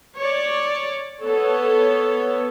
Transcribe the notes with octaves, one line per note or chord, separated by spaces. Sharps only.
C#5 D5
B3 A4 C#5